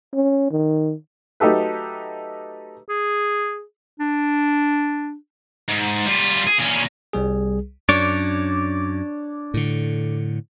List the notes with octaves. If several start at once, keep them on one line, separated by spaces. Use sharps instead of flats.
C#4
D#3
F#3 A3 D#4 G4 A4 B4
G#4
D4
G#2
G3 F4
G#4
A#2 C#4
C2 G3 G#4
F#2 D4 C#5 D5
A2 D3